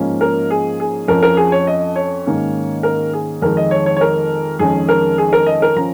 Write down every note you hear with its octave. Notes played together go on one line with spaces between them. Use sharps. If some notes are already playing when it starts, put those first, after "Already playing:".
Already playing: G#2 F3 A#3 C#4
A#4
G#4
G#4
F2 F3 C#4 A#4
A#4
G#4
C#5
D#5
C#5
G#2 D#3 A#3 C#4
A#4
G#4
F2 D#3 G#3 A#4
D#5
C#5
C#5
C#5
A#4
F2 D#3 G#3 C#4 G#4
A#4
G#4
A#4
D#5
A#4
F3 C#4 A#5